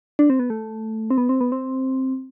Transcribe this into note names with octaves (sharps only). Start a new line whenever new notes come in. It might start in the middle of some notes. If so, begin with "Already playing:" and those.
D4
C4
B3
A3
C4
B3
C4
B3
C4